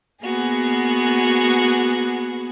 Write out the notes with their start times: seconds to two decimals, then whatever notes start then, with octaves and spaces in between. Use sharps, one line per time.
0.23 A#3 B3 F#4 G#4